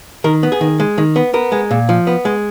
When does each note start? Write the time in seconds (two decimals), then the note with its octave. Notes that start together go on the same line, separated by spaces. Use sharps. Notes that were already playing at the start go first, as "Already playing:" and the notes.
0.24 D#3 A#4
0.43 B3
0.52 G#4
0.61 D#3
0.80 G#3
0.98 D#3
1.16 B3
1.34 B3 A#4
1.52 G#3
1.71 A#2
1.89 F3
2.07 B3
2.25 G#3